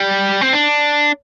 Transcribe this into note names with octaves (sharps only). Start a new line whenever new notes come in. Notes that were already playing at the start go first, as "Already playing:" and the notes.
Already playing: G3
C4
D4